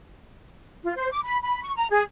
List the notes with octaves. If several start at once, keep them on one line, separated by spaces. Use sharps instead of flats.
F4
C5
D6
B5
B5
C#6
A#5
G#4